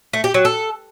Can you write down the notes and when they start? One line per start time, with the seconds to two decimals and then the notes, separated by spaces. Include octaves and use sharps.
0.13 A3
0.24 G4
0.34 F#3
0.45 A4